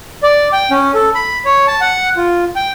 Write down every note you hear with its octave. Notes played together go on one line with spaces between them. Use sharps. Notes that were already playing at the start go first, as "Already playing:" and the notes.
D5
G5
C#4
A4
B5
C#5
A5
F#5
F4
G5